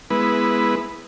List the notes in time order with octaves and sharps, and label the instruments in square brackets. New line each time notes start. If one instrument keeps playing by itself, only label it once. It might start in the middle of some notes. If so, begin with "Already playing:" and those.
[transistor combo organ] G#3 B3 E4 B4